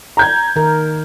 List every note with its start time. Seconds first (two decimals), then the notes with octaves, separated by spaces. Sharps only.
0.17 A#5 G6 G#6
0.56 D#3 A#4